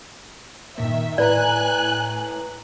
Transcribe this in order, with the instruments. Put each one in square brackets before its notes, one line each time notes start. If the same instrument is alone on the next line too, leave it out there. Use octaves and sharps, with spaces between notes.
[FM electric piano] G2 A#2 A#3 [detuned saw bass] D#3 [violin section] E5
[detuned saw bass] A2 [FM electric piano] E4 B4 A#5 [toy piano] D5 [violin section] G#5 F#6